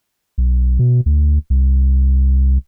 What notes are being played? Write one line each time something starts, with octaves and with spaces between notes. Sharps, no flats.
B1
B2
D2
C2